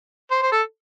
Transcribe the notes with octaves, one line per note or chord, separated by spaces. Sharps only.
C5
C5
A4